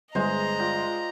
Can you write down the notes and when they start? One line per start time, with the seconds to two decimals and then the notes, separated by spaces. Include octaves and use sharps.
0.15 G1 G#3 G#4 C5 D#5 A#5
0.59 F4 D5 G5